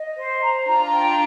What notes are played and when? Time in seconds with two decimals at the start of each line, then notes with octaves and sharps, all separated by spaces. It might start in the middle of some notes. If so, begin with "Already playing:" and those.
Already playing: D#5
0.17 C5
0.42 A#5
0.67 D4 F4 A#5
0.93 G5